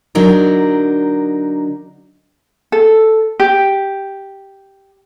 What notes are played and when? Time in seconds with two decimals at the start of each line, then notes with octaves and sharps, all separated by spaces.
0.15 D3 F#3 D4 D#4 A#4
2.72 A4
3.40 G4